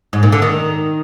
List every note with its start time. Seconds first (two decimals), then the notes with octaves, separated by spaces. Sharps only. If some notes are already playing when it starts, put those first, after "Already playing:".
0.13 G#2
0.23 A#2
0.32 D3
0.42 D#3